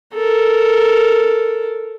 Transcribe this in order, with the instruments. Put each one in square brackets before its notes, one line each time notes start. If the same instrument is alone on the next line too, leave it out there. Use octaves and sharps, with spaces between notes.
[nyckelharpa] A4 A#4